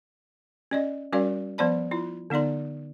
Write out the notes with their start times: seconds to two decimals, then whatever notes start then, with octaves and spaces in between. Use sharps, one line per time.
0.71 C#4 D5 D#5
1.12 G3 C#4 F#4 A#4 D5 F5
1.58 F3 B3 C5 D5 A5 B5
1.91 E4 F4
2.30 D3 B3 D#4 D5 C6